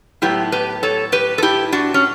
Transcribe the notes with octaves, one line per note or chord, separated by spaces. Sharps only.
A2 F#3 B3 E4 G4
G4 B4
A4 C#5
G4 B4
A4
E4 G4
D4 F#4
C#4